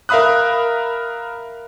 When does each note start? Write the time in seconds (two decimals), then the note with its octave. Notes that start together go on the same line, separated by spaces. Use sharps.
0.09 A#4 E5 F5 B5 D#6 F#6